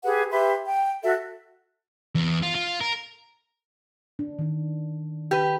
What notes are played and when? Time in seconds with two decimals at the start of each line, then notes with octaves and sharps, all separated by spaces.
0.04 G4 G#4 B4 F#5
0.31 G4 B4 E5 C6
0.65 G5
1.02 F#4 A4 E5
2.15 E2
2.42 F4
2.55 F4
2.81 A#4
4.19 D4
4.39 D#3 D4
5.31 G4 B4